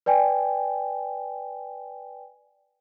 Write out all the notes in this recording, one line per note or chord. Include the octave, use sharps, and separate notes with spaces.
B4 D5 G5 G#5